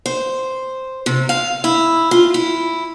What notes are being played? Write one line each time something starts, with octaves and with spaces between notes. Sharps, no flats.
C5
C3
F5
E4
F4
E4